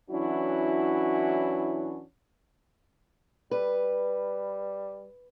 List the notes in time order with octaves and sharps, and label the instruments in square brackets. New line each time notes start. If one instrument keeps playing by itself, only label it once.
[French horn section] E3 F#3 C#4 D4 E4 F#4
[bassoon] G3 [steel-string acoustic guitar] B4